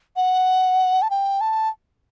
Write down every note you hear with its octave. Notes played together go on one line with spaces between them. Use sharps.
F#5
A5
G5
A5